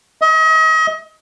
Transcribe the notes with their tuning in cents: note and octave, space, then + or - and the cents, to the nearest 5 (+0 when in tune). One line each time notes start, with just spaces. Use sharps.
D#5 +35